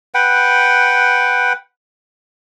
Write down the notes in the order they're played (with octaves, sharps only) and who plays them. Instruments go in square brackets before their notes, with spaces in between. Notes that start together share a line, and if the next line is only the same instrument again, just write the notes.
[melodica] B4 F#5 G5